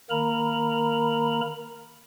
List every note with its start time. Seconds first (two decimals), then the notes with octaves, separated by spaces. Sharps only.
0.10 D#3 A#3 A#4 A#5 B5